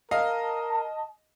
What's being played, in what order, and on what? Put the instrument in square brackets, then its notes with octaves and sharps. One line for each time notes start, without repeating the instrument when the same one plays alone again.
[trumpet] A#4 [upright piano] D#5 [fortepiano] F5 [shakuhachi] A5